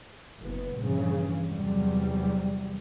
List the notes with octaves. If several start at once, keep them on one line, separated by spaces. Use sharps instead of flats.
F#1 B3
A#1 G2 C#3 E3
E2 C3 F#3 G3